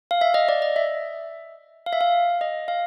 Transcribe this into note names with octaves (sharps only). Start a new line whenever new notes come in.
F5
E5
D#5
D5
D#5
E5
F5
E5
F5
D#5
F5